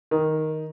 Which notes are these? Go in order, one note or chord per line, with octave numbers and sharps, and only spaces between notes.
D#3